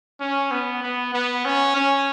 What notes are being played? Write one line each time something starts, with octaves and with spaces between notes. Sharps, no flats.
C#4
B3
B3
B3
C#4
C#4